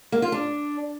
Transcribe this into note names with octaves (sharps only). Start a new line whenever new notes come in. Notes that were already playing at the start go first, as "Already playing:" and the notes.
A#3
F4
D4